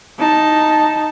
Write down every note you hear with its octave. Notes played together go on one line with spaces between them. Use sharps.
D#4 A5